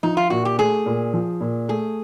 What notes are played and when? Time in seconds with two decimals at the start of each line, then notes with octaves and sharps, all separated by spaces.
0.03 F3 D#4
0.17 F4
0.30 A#2 F#4
0.45 G4
0.58 A3 G#4
0.86 A#2
1.14 F3
1.41 A#2
1.68 A3 G#4